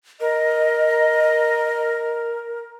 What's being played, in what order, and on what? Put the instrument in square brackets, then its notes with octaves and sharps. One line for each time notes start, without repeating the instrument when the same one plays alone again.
[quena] A#4 [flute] D#5